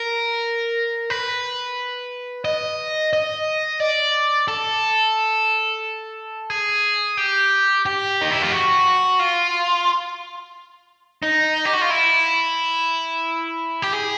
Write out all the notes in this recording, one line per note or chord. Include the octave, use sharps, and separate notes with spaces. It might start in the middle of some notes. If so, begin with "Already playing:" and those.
Already playing: A#4
B4
D#5
D#5
D5
A4
G#4
G4
G4
D#4
E4
F4
F#4
F4
D#4
G4
F#4
F4
E4
G4
G#4